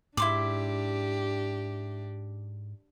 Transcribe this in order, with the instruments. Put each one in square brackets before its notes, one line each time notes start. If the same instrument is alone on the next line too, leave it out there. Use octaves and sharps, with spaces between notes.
[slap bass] G#2 [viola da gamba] D4 G4 [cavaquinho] E4 C6 D6